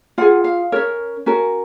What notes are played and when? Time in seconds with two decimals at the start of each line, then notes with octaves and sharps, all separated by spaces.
0.18 F4 G#4 F#5
0.44 F5
0.72 C#4 F#4 A#4 C#5
1.26 C#4 F#4 A#4